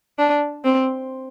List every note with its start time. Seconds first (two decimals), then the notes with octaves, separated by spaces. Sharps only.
0.19 D4
0.64 C4